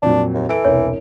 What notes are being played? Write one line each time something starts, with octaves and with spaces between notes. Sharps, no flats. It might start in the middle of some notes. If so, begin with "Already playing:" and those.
F2 A#2 F#3 D4
D#2
E3 A4 D7
E1 C2 C#5